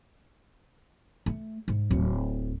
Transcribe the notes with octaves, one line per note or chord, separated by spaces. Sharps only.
A3
G#2
D1